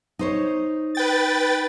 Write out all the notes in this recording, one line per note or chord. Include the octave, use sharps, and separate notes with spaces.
D#4 C5 C#5
B4 G5 A6